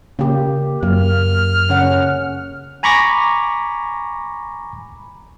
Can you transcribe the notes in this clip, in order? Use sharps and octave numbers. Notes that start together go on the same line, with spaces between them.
C#3 A#3 G4
F#2 A#3 F6
C#3 C#4 F#5
G#5 A#5 B5 C#6 D6 A#6